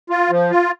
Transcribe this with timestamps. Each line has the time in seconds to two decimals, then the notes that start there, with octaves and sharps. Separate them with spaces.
0.10 F4
0.30 F3
0.50 F4